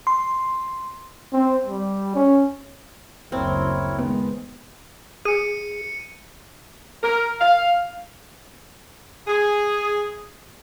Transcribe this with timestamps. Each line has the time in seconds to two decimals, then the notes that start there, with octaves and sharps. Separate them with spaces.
0.07 C6
1.33 C4
1.67 G3
2.15 C#4
3.32 F#1 D2 C4 E4 A#4 C#5
3.99 D#3 G#3 B3
5.25 G#4 C#7 D#7
7.03 A#4
7.40 F5
9.27 G#4